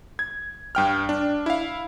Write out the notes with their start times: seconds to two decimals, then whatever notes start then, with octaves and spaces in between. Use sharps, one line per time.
0.19 G#6
0.75 G2 G5 F6
1.09 D4
1.46 E4 F5